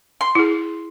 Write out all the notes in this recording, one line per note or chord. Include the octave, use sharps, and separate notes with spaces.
C6
E4 G#4